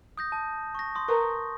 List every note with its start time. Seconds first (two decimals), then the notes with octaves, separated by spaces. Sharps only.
0.17 D#6 G6 A#6
0.32 A5
0.75 C#6 A#6
0.95 C6 D#6
1.08 A#4 B4 A#5 C#6